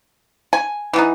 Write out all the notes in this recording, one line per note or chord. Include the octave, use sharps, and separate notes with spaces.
G#5
E3 B3 D#4